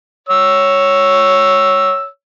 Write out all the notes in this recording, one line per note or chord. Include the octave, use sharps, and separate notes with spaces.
C#5 E6